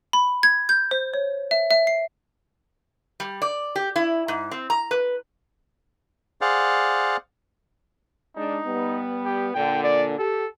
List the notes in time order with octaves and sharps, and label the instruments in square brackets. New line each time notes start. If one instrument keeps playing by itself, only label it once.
[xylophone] B5
G#6
G6
C5
C#5
E5
E5
C7
[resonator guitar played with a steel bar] G3
D5
G4
E4
G#2
C4
A#5
B4
[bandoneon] G#4 C5 D5 F5 F#5
[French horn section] G#3 D4 [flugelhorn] D#4
[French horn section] G3 B3
[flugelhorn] G4
[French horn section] A#2 D3 [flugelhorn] G5
[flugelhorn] D5
[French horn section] G4 [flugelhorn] A4